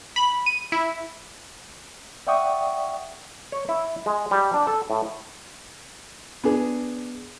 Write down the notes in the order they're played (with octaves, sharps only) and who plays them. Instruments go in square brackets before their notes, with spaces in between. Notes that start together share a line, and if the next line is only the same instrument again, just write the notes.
[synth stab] B5
D#7
E4
[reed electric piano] D5 E5 F#5 G5 C#6 D#6
[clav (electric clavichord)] C#5
E4
G#3
G3
D4
A4
A2
[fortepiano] B3 D4 G#4